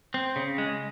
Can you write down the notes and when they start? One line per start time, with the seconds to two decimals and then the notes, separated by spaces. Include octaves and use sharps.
0.14 C4
0.36 C#3
0.58 G#3